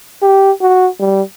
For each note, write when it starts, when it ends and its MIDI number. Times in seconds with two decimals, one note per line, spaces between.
0.22 0.51 67
0.61 0.88 66
1.00 1.22 55